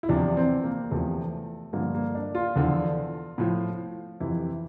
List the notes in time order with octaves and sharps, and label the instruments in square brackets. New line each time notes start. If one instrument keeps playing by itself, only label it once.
[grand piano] E4
E2 C3 F3 D4
C4
A#3
E2 C3 F3 A3
G2 D3 F3 A#3
A#3
D4
F4
E2 D3 F3
A2 F3
F2 C3 E3 E4